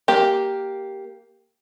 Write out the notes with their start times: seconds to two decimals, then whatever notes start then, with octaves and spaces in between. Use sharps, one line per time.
0.08 A#3 G4